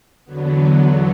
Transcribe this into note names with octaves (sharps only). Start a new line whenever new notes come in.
E2 D3 F#3 B3